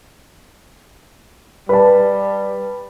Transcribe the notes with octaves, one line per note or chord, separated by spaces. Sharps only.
G3 B4 A5